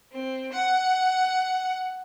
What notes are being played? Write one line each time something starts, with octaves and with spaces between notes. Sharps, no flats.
C4
F#5